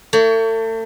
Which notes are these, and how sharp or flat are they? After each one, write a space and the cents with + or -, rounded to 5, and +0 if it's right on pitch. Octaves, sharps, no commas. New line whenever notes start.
A3 +35 C#5 +35